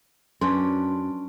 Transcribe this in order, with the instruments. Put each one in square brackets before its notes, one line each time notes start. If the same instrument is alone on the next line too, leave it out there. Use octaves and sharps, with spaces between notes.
[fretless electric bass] F#2 [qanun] C#4 D4 B4 [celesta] C6